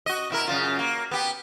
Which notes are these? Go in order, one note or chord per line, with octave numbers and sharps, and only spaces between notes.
F#4 D#5
B2 E4 A#4
F#2 C#3 F4
A#3
B3 G4